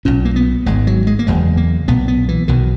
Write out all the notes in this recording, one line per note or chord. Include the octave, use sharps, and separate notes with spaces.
B1 A#2 C#4
A#3
B3
G#1 G#2 G#3
F#3
G#3
A#3
F#1 E2 C#3 G#3
A#3
B1 A#2 B3
B3
E3
B1 B2 D#3